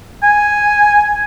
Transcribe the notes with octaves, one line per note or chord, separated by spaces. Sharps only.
G#5